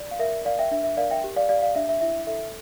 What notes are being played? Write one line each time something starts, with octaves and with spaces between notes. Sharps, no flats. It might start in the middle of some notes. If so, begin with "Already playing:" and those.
Already playing: D5
F5
A#4 E5
A#4 D5 F5
E5 G5
D4 E5
E5
A#4 D5 F5
E5 G5
G4
D5 F5
G4 D5 F5
D5 F5
D4 E5
E5
E4 E5
A4 E5